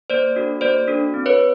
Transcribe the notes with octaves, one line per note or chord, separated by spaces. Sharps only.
A#3 C5 D5
D4 F#4 A4
A#3 C5 D5
D4 F#4 A4
C4
B4 C#5